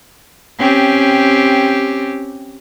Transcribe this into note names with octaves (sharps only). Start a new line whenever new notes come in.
C4 C#4 G4